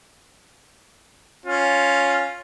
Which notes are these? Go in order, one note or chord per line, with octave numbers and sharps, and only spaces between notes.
C#4 F4